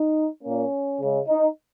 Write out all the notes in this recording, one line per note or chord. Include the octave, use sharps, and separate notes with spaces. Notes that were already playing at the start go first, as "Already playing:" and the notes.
Already playing: D#4
A#2 A#3 C#4
C#3 G#3
D#4